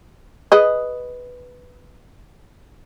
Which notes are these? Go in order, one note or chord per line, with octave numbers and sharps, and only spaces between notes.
G#4 B4 D#5